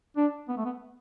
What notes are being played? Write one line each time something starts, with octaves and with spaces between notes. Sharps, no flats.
D4
B3
A3
B3